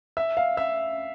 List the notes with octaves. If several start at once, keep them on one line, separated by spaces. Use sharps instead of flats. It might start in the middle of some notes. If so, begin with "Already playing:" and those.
E5
F5
E5